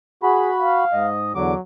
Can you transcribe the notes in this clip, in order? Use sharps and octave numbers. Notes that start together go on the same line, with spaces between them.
F#4 G#4 B5
F5
G#2 D#5
E2 D3 F#3 D6